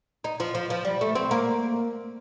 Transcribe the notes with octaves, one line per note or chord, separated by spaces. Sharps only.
D#4
F3
F3
F3
G3
A3
C4
A#3